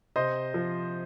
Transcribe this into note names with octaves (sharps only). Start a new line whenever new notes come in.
C3 C5 D#5
F3